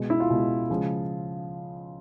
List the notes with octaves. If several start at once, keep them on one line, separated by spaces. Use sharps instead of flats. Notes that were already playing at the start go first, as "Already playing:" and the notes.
Already playing: B2 G#3
E4
F4
B2 G#3
C#3 F3 G#3